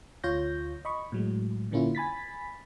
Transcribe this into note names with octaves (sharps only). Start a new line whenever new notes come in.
D2 F4 C#5 F5 G6 A#6
D#5 B5 C#6
A2 F#3 G#3
A#2 D3 A#3 C#4 E4 F4
G#5 B5 A6 B6